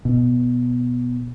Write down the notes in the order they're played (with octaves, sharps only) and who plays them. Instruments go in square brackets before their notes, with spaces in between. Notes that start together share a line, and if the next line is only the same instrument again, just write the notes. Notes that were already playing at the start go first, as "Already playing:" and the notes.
[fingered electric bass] B2